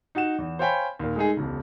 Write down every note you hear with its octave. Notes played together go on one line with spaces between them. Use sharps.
D#4 F#4 F#5 E7
E2
C5 C#5 F5 G5 G#5 B5
D#2 A#2
G#3 A3 D#4 G#4
E1 C#2